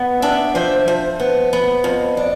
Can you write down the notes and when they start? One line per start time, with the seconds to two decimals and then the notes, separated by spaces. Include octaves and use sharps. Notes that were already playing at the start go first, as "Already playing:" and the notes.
Already playing: B3
0.22 D4 E5 G5
0.55 F3 C5 E5
0.88 F3
1.20 B3
1.53 B3
1.84 F2
2.17 D4